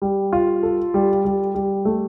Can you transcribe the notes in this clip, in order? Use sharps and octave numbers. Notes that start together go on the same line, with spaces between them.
G3
F4
A4
G3
G3
G3
A3